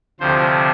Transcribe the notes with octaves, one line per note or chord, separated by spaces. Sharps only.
D2 C3 F3 C5